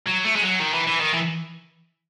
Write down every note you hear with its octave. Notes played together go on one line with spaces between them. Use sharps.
F#3
A3
G#3
F#3
D#3
E3
E3
D#3
E3